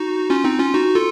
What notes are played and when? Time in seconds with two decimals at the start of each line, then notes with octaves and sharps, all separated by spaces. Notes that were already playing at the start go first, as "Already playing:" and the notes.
Already playing: D#4 F#4
0.30 C#4 F4
0.44 C4 D#4
0.59 C#4 F4
0.74 D#4 F#4
0.95 F4 A4